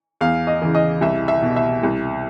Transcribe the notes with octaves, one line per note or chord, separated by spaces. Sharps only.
E2 F5
D#5
C#3 E3
D#5
C2 E5
E5
B2
E5
C2